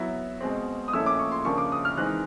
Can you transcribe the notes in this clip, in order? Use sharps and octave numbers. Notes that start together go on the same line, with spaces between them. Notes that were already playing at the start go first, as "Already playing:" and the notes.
Already playing: F#3 B3 E4
B2 G#3 C4
D#6
A#2 F3 A3 C#4 E4 E6
D6
C#6
C6
C#3 F3 A#3 D4 C#6
D6
D#6
F6
E3 G#3 C4 D#4 F#6